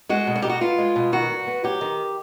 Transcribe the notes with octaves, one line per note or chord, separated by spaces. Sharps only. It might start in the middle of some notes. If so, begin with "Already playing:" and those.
G#3 F#4
B2
F#4
D#4 G4
F#4
B3 F4
G#3
B2
D#3 F#4
G2
B3
F#3 G4
D#3